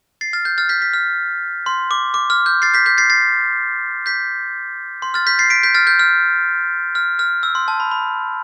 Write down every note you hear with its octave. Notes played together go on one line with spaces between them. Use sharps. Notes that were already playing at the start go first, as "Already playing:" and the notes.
A6 C7
F6 A6
G6
F6 A6
G6 B6
G6 B6
F6
C6
D6
D6
F6
G6
A6 C7
G6 B6
G6 B6
A6 C7
A6 C7
G6 B6
C6
F6 A6
G6 B6
A6 C7
B6 D7
G6 B6
F6 A6
G6
F6
F6
F6
E6
C6
A5
B5
B5